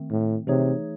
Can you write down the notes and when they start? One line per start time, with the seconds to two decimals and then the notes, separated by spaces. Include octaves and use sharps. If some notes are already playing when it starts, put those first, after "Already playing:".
Already playing: D#3 A3 C4
0.11 A2
0.47 C3 E3 A3 D#4 G#4 C#5